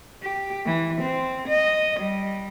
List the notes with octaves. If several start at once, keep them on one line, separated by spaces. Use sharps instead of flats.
G4
E3
C4
D#5
G3